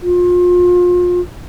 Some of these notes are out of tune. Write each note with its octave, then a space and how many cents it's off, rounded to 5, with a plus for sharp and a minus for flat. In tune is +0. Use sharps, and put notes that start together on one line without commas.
F4 +30